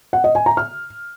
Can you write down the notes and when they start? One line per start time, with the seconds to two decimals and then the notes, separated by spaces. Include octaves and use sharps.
0.13 F#5
0.24 D#5
0.35 G#5
0.46 A#5
0.57 F6